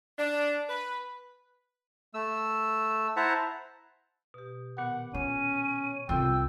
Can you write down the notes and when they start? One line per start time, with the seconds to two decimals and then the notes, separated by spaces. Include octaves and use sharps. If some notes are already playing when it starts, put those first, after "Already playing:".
0.18 D4
0.69 B4
2.14 A3 E6
3.16 E4 C5 E5 F#5 A5 A#5
4.34 B2 G4
4.78 A#2 D#3 B3 F#5
5.14 C#4 F4 D#7
6.09 C2 D3 C4 F4 A4 G5 E6